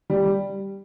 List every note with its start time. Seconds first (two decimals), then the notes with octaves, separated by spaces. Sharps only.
0.10 G3